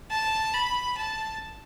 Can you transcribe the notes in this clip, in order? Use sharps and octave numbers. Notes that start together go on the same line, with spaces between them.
A5
B5
A5